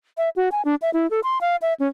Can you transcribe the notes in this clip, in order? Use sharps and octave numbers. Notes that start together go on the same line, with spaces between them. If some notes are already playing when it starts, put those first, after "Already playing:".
E5
F#4
G#5
D4
E5
E4
A4
C6
F5
E5
C#4